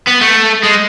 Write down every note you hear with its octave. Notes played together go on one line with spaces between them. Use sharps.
B3
A3
G#3